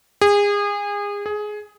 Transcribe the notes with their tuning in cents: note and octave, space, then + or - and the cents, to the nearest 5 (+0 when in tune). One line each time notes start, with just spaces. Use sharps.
G#4 -30
G#4 +15